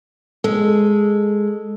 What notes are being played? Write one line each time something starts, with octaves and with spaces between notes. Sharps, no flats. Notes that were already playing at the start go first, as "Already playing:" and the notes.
G#3 A4